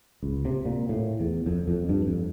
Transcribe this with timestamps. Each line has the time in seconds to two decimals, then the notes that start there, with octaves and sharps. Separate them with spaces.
0.23 C#2
0.45 C3
0.65 A#2
0.89 A2
1.20 E2
1.46 F2
1.68 F2
1.89 G2
2.07 F2